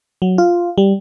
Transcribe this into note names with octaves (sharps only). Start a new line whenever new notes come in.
F#3
F4
G3